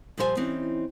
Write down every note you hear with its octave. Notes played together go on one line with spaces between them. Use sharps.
A#2 F3 G3 C5 C#5 G#5
E3 C4 C#4 D#4